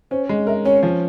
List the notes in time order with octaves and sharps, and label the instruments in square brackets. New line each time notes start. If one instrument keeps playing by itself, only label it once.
[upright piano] C#4 [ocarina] C5
[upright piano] G#3
[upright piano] A#4 [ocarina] E5
[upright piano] C#4 [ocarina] C#5
[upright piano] F3